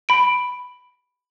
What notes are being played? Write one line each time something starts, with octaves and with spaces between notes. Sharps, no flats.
B5 D7